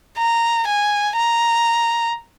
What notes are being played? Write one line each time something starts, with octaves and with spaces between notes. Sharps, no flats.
A#5
G#5
A#5